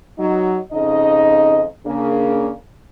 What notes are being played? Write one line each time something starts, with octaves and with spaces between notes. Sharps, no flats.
F#3 D#4
F2 C#3 D#4 D#5
C#3 A#3 D4